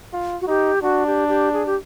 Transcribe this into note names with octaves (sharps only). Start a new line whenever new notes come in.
F4
F#4
D#4 G4
D4 F#4
G4
G4
G#4
G4